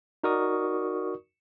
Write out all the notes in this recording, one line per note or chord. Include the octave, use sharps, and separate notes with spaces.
D#4 F#4 A#4 D5 C#6 D#6